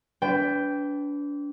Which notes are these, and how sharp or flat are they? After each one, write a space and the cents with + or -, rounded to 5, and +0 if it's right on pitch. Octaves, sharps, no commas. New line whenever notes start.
D4 -30 B4 +15 G5 +0